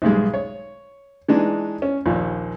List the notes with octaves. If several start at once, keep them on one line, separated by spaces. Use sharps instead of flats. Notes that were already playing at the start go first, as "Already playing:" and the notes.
B1 G#2 G3 G#3
C#5
E3 G#3 D4 D#4
C#4
A#1 D#2 A#2